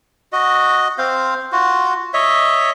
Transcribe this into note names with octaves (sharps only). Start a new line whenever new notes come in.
F#4 D#5
C4 C5 F5
F4 F#4
C#5 D#5 E5